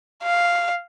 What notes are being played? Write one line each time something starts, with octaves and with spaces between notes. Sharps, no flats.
F5